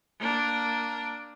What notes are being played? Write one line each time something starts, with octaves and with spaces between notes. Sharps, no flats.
A#3 D4